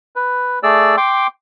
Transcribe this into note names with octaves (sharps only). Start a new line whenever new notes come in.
B4
A3 G#4 D5 E6
G5 C6 D6